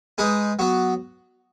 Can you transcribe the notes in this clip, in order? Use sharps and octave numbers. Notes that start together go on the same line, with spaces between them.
G#3 D#4 G#4 B4
F#3 B3 F#4